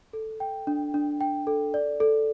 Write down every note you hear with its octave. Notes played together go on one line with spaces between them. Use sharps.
A4
G5
D4
D4
G5
A4
D5
A4